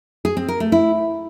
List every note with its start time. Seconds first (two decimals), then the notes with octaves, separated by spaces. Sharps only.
0.25 G#4
0.37 C4
0.48 A#4
0.60 A3
0.72 E4